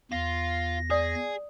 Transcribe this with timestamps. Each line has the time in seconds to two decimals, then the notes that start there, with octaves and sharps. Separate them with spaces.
0.12 E2 F4 A#6
0.90 G#4 D5 D#6